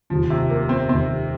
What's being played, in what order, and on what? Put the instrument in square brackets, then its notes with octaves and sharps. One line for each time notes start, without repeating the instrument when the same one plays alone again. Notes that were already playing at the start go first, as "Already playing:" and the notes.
[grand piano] F1 D#2 D#3 [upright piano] F3
[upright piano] C3
A#3
C4
[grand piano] F1 D#2 D#3 [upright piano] C4